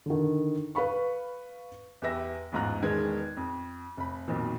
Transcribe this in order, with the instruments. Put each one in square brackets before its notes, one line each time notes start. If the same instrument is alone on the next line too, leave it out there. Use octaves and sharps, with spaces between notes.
[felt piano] D3 D#3
B4 F5 B5 C#6
[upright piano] E2 G4 B4 E5 A#6
A1 E2 G#2 F4 A#5 F#6
E1 D#3 G#3 B3 G#6
F2
F1 B5
B1 F2 A#2 D#3 F3